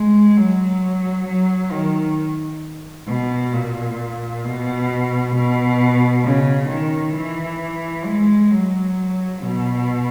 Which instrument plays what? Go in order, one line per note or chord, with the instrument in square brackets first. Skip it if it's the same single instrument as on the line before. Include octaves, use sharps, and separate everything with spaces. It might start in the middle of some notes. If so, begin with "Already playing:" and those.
Already playing: [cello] G#3
F#3
F#3
D#3
B2
A#2
B2
B2
C#3
D#3
E3
G#3
F#3
B2